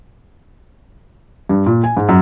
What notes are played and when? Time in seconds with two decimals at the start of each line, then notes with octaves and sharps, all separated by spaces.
1.49 G2
1.66 A#2
1.84 G#5
1.97 G#2
2.09 F#2